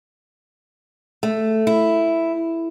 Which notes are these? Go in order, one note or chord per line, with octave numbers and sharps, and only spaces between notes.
A3
E4